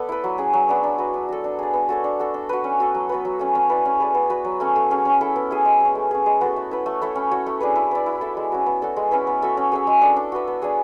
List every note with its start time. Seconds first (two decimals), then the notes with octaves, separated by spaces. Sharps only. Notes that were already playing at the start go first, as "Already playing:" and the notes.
Already playing: B3 A4 D5
0.09 E4 B4
0.24 F#3
0.38 C#4 G#4
0.53 F#3
0.69 B3 D4
0.83 D4
0.98 F#4 B4
1.14 D4
1.29 F#4 A4
1.44 D4
1.59 G#4 D5
1.73 B3
1.89 F#4 A4 C#5
2.04 D4
2.20 F#4 A4
2.34 D4
2.49 F#4 B4
2.64 C#4
2.80 F#4 A4
2.94 F#3
3.09 B3 F#4 B4
3.25 F#3
3.39 A3 C#4
3.55 C#4
3.69 E4 B4 D5
3.85 C#4
4.00 G#4 B4 D5
4.15 B3
4.30 F#4 B4
4.45 F#3
4.60 A3 C#4
4.76 A3
4.90 C#4 G#4
5.05 C#4
5.21 E4 A4
5.36 B3
5.51 E4 G#4
5.65 G#3
5.80 C#4 G#4
5.95 A3
6.11 C#4 G#4
6.26 G#3
6.41 B3 F#4 A4
6.56 A3
6.71 E4 B4
6.86 A3
7.02 E4 A4 C#5
7.15 C#4
7.31 F#4 C#5
7.46 A3
7.61 D4 G#4 B4
7.76 E4
7.91 B4 D5
8.06 E4
8.21 A4 E5
8.37 G#3
8.52 C#4 F#4
8.66 B3
8.81 F#4 A4 D5
8.96 G#3
9.11 C#4 E4 B4
9.27 B3
9.42 F#4 A4 E5
9.57 C#4
9.72 G#4 C#5 E5
9.87 G#3
10.01 D4 A4
10.16 D4
10.32 F#4 B4 E5
10.47 B3
10.62 D4 G#4 C#5